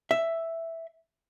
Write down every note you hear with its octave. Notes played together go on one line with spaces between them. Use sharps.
E5